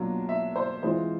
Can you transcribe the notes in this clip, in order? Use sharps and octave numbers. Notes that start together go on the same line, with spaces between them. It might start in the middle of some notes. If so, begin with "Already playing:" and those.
Already playing: B2 F#3 A#3 D4 F4
E5
C5
E3 G#3 C4 F4 C5